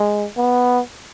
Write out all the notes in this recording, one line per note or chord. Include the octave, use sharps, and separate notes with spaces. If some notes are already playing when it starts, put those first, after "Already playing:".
Already playing: G#3
B3